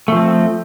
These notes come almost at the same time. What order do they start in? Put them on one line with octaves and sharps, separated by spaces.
A3 F3 C4